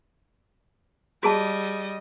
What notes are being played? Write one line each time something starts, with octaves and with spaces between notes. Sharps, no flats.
G3 F#4 G#4 D#5 A5